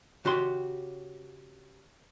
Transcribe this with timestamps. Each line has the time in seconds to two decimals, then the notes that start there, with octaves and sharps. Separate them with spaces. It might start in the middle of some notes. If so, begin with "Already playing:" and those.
0.25 C#3 F#4 G4 C6